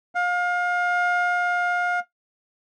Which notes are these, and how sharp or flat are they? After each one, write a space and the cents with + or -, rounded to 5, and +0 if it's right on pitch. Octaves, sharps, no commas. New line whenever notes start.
F5 +30